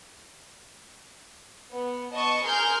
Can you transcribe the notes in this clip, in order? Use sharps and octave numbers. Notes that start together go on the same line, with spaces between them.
B3
B3 D#5 A5 C#6
G#4 A#4 C6 F6 G6